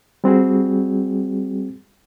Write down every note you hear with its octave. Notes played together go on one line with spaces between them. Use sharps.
G3 C4 F#4 G#4